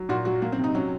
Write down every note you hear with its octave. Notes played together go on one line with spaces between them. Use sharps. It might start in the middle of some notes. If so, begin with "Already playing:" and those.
Already playing: F#3
A#2 F#4
F#3 F#4
F#3 A#3
C4
C3
D#4
F#3 C#4